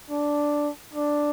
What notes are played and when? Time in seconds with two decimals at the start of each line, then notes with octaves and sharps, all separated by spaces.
0.10 D4
0.94 D4